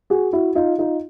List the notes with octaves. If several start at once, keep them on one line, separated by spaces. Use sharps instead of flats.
F#4 G#4
E4 F#4
D#4 F4
D#4 F4